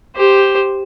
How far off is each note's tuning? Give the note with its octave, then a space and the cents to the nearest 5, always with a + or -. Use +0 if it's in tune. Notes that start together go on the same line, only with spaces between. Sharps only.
G4 +0 C5 +0